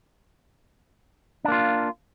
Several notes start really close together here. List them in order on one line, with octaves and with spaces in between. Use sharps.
D4 A#3 F4